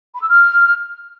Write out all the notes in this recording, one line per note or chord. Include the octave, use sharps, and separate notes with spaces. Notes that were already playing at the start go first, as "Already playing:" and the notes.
B5
E6
F6